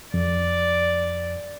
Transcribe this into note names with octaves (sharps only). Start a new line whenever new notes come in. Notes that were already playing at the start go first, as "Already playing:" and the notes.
F2 D5